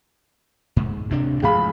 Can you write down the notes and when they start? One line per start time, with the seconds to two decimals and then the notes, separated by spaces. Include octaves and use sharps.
0.76 G#2
1.10 D2 C3 D4
1.42 A1 G#2 F3 G#4 F5 B5